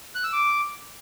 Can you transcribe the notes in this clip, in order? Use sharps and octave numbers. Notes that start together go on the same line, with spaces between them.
F#6
E6
D6